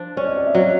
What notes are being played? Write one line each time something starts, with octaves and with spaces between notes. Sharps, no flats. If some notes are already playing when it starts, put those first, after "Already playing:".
Already playing: F3 D4
C#4 D5
D#5
D5
E5
F#3 D#5